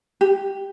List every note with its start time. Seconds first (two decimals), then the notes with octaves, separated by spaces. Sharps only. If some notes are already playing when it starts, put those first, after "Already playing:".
0.21 G4